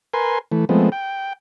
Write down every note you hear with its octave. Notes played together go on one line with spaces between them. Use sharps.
A#4 B4 G#5 C6
E3 A3
F3 G#3 A3 B3 C4
G5